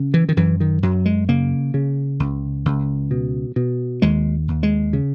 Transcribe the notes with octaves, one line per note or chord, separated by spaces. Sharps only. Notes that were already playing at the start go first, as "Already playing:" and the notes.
Already playing: C#3
E3
D#3
F#2 E3
D#3
F#2 F#3
G#3
C#3 A#3
C#3
C#2
C#2
B2
B2
D#2 G#3
D#2
G#3
C#3